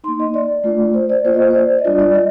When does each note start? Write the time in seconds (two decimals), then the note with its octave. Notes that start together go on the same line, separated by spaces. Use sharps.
0.04 A#3 D#4 C6
0.20 D#5
0.34 D5
0.64 A3 D4 F4
0.94 C5
1.09 D5
1.25 A#3 F4 C5
1.34 D#5
1.50 C5
1.55 D5
1.79 D#5
1.85 G3 D4 F4 D5
1.99 D5
2.14 D#5